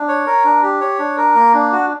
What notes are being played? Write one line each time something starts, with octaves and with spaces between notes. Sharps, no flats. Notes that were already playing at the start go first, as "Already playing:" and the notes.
Already playing: D4
C#5
A#4
D4
G4
C#5
D4
A#4
A#3
D4
F#4